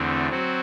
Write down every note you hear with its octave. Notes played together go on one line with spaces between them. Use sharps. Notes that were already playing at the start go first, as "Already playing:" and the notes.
Already playing: E2 D3 A3 C4
F#3 C4 F#4